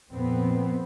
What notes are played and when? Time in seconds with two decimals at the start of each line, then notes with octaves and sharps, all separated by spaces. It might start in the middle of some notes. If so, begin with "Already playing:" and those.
0.10 F2 A#2 B3 C4